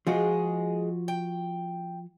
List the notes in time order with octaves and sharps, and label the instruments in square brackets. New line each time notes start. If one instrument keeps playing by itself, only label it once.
[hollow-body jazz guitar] F3 F4 F#4 [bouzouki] G#3 G#4
[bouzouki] G5